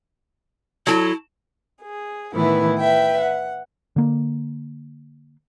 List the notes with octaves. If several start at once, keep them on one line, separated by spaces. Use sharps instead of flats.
F#3 E4 A4
G#4
A2 D#3 E3 B3 E4
B4 E5 G5
F#5
D3 A#3